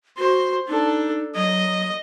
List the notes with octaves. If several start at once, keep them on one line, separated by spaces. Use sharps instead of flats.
F#4 C5
D4 D#4 A4
F#3 D#5